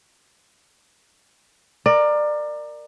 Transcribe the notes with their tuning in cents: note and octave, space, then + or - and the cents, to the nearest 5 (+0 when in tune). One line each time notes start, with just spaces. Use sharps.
A#4 +0 D5 +25